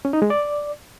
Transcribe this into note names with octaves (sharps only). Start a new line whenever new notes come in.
C#4
D#4
G#3
D5